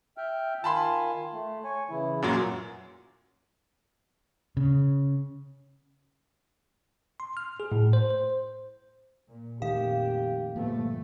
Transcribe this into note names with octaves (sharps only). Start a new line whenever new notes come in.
E5 G5 F6
D#3 F4 G#5 A5 B5 C6
A3
C#5 G#5
C#3 E3 E4
F#2 A#2 F#3
C#3
C6
F6
G#4
A2
C5
C5
A#2
F2 A#2 D#3 A3 G4 F5
G1 A#2 F3 A3 B3